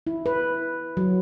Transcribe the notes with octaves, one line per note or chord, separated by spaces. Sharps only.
E4
B4
F#3